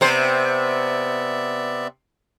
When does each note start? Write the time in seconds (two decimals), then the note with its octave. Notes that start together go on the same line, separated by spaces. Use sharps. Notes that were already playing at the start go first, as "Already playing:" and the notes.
0.01 C3 B3 C5 D5 E5